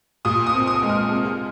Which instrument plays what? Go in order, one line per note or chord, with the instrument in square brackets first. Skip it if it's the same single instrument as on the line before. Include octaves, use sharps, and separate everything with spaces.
[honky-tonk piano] A#2 D#6
D#6
C4
D#6
G#3
F6
C3